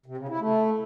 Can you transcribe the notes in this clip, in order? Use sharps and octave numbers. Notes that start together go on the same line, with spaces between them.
C3
C#3
E4
A3